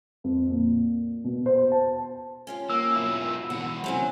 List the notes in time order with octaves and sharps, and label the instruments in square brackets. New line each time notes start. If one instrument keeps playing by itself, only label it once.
[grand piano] F2
A#2
B2
C5
A5
[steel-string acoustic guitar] C#4 F4 G4
[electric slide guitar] A#3 [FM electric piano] E6
[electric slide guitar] B2 F#3 E4
[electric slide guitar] B2 D#3 E3 [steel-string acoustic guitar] F#5
[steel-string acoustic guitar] C3 E3 C#4 [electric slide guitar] F#3